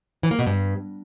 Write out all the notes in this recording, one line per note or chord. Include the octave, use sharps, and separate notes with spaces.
E3
A#3
B2
G2